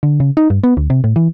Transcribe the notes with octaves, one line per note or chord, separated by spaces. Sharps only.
D3
C#3
D#4
G2
B3
D2
C3
A2
E3